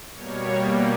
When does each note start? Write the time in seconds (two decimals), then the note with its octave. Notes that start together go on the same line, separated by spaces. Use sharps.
0.15 B2 G3 A#3 C#5